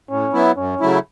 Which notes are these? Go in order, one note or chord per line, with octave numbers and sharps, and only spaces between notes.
A2 C#4
F#3 B3 E4
F#2 C#4
C#3 F#3 A3 E4